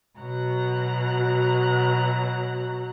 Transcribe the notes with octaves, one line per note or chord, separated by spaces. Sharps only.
B2 F#3 A#5 F#6